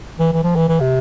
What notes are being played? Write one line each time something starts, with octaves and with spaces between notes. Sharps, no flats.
E3
E3
F3
E3
E3
C3